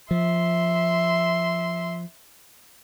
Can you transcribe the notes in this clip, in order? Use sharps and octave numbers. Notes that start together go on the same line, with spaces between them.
F3 E5 C6